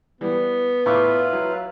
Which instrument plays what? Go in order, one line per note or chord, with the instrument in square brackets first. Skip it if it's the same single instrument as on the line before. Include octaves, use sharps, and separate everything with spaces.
[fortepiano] E3 G3 [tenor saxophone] B3
[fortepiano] A2 C#6 D6 [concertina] E4 F4 B4
[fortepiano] F#3